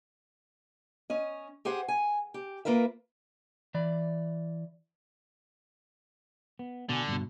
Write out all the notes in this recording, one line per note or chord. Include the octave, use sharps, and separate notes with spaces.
C#4 D#5
G4 G#4 C5 F#5
G#5
G4
A#3 F4 A#4 B4 E5
E3 D5 B5
B3
B2 D3 G#5
G2 B2